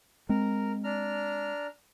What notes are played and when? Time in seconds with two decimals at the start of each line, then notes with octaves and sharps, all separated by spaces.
0.29 G#3 C4 A#4
0.84 D4 A#5 F6